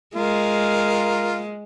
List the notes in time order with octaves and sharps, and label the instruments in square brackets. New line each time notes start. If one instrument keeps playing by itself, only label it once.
[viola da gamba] G#3 [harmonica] F4 A#4